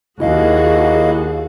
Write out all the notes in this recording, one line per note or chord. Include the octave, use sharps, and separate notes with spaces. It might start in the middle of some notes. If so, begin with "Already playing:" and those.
D#2 E4 F#4 G#4 D#5 F5